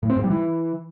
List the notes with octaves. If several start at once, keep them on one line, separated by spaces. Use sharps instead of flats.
A2
C4
G#2
G3
E3